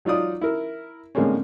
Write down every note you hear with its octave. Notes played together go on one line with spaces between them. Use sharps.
F#3 D#4 F4 D5 D#6
E4 A#4
A2 D3 G#3 A#3 C4 C#4